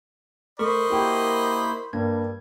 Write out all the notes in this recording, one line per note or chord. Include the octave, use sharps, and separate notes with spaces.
A3 A#4 C5 D#5 B5 C#6
A#3 E4 F#4 G4
G2 G3 A#3 G#6